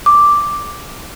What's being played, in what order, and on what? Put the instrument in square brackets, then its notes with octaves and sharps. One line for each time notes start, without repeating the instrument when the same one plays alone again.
[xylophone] D6